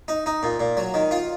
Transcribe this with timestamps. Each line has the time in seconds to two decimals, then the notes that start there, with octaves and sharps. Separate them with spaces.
0.08 D#4
0.26 D#4
0.43 A#2
0.60 A#2
0.77 F#3
0.94 D#3
1.11 F4